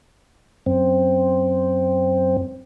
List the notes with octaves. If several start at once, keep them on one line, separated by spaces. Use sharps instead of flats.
F#2 C4